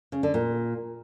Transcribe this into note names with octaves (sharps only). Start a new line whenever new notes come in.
C#3
D3
A#2